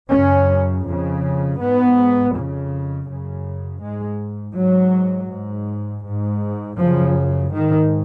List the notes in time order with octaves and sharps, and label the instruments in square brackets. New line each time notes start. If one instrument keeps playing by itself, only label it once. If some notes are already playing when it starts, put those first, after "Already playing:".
[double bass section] F#2 C#3 C#4
F2 C#3
G#2 B3
F2 C#3
F#2 C#3
G#2 G#3
G#2 F#3
G#2
G#2
F#2 C#3 F3
G#2 D#3